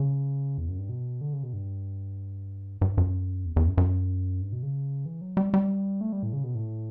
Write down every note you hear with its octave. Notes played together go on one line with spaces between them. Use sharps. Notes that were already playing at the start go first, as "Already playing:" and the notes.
Already playing: C#3
E2
F#2
G2
B2
D3
C#3
B2
G2
G2
F#2
E2
E2
F#2
F#2
G2
B2
C#3
E3
F#3
G3
G3
A3
G3
A2
C#3
B2
A2